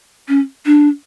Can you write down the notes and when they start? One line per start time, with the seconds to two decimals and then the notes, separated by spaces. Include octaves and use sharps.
0.28 C#4
0.66 D4